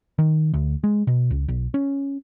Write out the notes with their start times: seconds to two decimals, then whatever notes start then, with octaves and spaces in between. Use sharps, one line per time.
0.19 D#3
0.54 D2
0.84 G#3
1.07 B2
1.31 C#2
1.48 B1
1.74 C#4